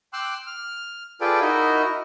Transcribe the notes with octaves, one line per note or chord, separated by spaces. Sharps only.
G5 C6 D6 E6 F#6
F6
F4 G#4 A4 B4 D5 G5
D#4 E4 F#4 A#4 D#5